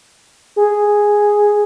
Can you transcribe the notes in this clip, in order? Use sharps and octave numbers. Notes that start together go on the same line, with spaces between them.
G#4